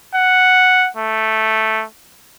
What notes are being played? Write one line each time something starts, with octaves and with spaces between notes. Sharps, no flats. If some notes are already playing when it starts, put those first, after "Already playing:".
F#5
A3